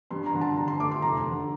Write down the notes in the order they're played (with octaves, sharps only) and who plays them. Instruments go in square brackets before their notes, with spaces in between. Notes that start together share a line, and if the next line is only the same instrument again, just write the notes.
[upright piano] G2 [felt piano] C6
[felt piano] A#5
[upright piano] D3
[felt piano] A5
[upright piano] D3 [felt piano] A#5
[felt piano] C6
[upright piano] A3 [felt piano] D6
[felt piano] C6
[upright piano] F1 [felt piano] A#5
[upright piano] D3